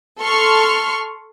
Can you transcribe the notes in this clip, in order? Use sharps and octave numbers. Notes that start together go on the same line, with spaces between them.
A4 C6 C#6 F6